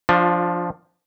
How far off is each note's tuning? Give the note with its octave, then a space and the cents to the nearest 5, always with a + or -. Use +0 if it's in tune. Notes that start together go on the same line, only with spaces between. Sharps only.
F3 +0 D4 +0 F4 +35